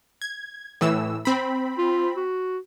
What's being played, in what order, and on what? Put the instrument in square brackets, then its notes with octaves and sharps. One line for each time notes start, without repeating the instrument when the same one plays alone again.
[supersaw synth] G#6
A2 E3 E6
C4 B5
[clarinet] F4
F#4